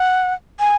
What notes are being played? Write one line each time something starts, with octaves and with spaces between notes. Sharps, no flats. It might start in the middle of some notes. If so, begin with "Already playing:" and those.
Already playing: F#5
G#5